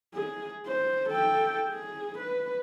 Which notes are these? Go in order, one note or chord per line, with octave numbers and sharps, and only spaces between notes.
G#4
C5
A4 G5
G#4
B4